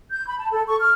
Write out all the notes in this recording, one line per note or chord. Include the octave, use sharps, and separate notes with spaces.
G6
B5
A5
A4
C#6
F6